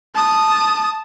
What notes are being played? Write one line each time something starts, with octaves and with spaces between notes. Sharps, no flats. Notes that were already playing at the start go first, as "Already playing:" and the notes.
A5 D#6